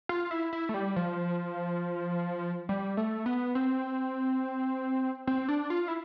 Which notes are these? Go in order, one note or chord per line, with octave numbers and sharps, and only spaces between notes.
F4
E4
E4
A3
G3
F3
G3
A3
B3
C4
C4
D4
F4
E4